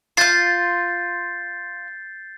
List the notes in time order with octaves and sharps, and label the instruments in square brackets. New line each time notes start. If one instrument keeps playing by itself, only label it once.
[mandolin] F4 C6 [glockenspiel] G6 A6 C7